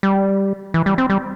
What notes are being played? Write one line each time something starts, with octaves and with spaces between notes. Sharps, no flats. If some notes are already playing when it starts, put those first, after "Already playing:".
G3
E3
G3
C4
G3